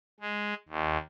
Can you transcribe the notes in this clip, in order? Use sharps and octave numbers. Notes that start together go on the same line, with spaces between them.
G#3
D#2